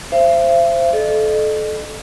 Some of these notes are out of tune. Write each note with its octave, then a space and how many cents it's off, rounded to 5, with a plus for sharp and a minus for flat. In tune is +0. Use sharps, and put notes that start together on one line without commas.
C5 +5 E5 +45
A4 -25 D#5 -45